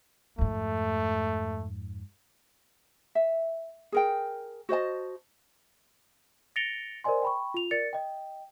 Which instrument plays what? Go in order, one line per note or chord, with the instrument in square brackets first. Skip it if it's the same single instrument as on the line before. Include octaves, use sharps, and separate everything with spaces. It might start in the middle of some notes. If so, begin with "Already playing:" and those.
[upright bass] F2 G#2 [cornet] A3
[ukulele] E5
G#4 A#4 G5
F#4 C5 D#5 A5
[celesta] A6 A#6 C#7 D7 F7 G7
A#4 C5 D5 D#5 G#5 C6
G5 B5 C#6
F4 F7
A#4 D5 A6 C#7
D#5 G5